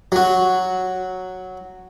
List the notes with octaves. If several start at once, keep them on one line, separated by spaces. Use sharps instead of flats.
F#3 F#4